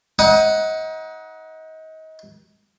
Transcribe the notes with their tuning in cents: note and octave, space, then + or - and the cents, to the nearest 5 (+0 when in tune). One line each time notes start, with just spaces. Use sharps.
D#4 +30 F#5 +0 D#6 +10